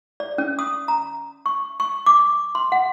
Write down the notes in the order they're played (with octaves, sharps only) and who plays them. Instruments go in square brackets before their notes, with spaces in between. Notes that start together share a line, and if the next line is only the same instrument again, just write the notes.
[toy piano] D5
C#4
D#6
A#5
C#6
C#6
D6
C6
F#5